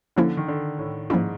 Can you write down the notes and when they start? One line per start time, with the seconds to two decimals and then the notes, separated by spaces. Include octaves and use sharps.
0.16 D3 F3 A#3 C#4 E4
0.37 D#3
0.48 D3
0.79 A2
1.10 G#2 F3 A#3 C#4 E4